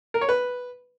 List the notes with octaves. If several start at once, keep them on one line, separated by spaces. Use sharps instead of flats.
A#4
C#5
B4